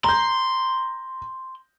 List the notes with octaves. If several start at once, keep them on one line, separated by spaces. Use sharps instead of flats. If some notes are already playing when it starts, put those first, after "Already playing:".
A#5 C6 G6